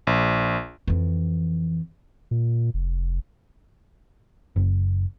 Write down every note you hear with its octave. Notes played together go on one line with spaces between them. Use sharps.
A#1
F2 E3
A#2
F1
F#1